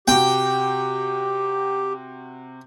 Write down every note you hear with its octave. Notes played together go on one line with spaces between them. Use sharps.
C3 F#4 G4 G5